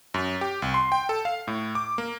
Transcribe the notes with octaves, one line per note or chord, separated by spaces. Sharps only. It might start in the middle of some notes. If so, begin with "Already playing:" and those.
F#2
G4
C2
C6
G5
A4
F5
A2
D6
A#3